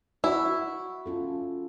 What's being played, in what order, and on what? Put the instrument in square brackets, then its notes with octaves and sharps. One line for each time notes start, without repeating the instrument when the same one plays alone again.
[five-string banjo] E4 [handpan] F#4
[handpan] C#4 F4 A4